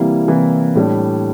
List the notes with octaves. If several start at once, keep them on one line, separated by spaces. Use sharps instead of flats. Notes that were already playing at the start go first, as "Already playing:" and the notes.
Already playing: C3 E3 G3 A#3 E4
C3 E3 G3 A#3 E4
A2 G3 D4